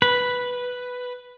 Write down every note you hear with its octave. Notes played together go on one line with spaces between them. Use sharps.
B4